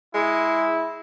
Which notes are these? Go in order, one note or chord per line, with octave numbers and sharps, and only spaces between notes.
G#3 E4